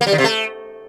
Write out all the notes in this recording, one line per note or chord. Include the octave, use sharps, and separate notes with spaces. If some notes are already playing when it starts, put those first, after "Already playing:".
A#3
G3
D#3
C3
A3